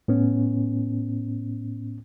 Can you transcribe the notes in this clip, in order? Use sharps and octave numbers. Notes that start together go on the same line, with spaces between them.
A2 B3 C#4